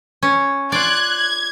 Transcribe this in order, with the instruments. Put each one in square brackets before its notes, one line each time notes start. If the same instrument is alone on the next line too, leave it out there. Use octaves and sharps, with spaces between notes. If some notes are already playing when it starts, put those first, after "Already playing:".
[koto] C#4
[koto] F4 D5 [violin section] F#6 G#6
[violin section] G#6